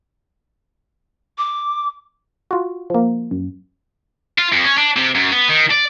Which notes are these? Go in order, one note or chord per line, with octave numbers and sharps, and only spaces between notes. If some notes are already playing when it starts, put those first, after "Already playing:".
D6
F4 F#4
F3 A#3
F#2
F4
F2
C#4
D4
C3
F#2
B3
D#3
D5